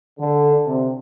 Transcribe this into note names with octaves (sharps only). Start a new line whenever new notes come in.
D3
C3